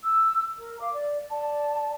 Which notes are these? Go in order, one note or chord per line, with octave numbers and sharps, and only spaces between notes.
E6
A#4
F5 D6
D5
D5 A5